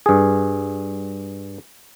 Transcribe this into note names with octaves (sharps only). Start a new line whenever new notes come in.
G2 G#4